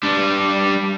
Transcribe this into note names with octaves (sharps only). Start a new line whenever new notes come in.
G3 D4